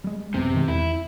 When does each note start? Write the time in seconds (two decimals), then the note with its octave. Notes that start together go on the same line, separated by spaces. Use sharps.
0.04 G3 G#3
0.34 A1 F#2 C3 B3
0.53 B2 D#3 G#3
0.68 E2 E4